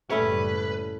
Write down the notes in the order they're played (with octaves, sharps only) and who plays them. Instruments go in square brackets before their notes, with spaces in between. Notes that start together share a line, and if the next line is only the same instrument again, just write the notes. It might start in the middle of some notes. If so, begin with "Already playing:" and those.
[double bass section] F#1 A2 G3 [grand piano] A3 [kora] C#4 E4 C#5 [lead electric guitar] B4